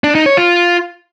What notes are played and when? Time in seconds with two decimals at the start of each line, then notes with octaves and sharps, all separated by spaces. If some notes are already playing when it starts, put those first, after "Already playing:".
0.04 D4
0.15 D#4
0.26 C#5
0.37 F4